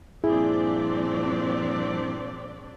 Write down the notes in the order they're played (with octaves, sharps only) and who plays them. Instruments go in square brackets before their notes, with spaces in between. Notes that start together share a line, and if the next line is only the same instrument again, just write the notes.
[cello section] G2 A#2 F3 [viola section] C4 D4 D5 [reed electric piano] E4 [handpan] G#4